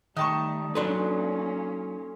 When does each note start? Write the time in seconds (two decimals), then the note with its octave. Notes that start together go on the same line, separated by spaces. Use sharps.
0.16 D#3 G3 A3 D#4 A5 C#6
0.75 F#3 A#3 C#4 D4 A4 B4 C6